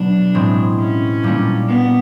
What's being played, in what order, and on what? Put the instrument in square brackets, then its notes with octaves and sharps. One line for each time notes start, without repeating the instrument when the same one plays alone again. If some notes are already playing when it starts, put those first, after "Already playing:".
Already playing: [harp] B2 F#3 B3 [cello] D4
[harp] A2 E3 G#3 C4
[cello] C#4
[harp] A#2 G3 A#3 D4
[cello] B3